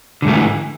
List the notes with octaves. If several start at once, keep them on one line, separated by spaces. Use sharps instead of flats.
G#2 D3 E3 F3 A3